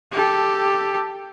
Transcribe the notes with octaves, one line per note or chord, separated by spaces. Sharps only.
G4 A4